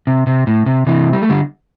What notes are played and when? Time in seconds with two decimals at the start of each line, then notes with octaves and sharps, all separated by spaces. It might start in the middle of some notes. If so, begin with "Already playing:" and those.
0.07 C3
0.27 C3
0.47 A2
0.66 C3
0.87 C3 E3
1.13 G3
1.21 A3
1.29 D3 G3